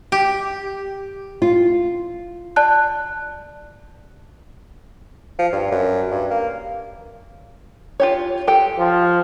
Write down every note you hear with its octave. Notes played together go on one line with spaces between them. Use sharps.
G4
F4
D5 A5 F#6
F3
G2
F#2
G2
A#3
F4 G4 C#5
G4 A4 G5
F3